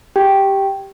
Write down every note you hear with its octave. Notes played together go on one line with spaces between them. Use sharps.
G4 G5